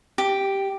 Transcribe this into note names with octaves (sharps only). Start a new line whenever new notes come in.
G4